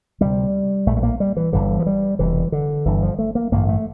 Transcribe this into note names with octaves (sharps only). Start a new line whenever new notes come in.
D2 C3 G3
A#1 A2 A3
A3
A#3
G3
E3
G1 G2 D3 E3
F3
G3
E1 D2 C3 E3
D3
G1 G2 D3 E3
F3
A3
A#3
A1 G2 D3 A#3
A3